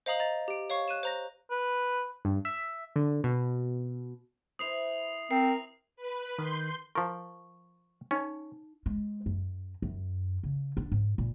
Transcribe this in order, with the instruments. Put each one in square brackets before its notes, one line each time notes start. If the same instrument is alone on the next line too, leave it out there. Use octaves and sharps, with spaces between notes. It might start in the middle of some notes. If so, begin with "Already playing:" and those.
[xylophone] C5 D#5 F5 A#5 D#6 F#7
D#5 A#5 A6
G4 D7
C#5 F5 C#6
F#6 D#7 E7
C5 A#5 A#6
[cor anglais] B4
[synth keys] G2
E5
D3
B2
[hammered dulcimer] E4 B4 C5 [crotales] D#6 C7 F7
[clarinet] C4 [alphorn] A#4 [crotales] C7
[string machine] B4
[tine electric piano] D#3 [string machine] C6 G6
[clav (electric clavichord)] F3 A#4 [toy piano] C#6
[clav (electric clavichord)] C#4 [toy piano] D#4
[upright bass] G#3
F#2
F#2
C#3
D4
G#2
A#2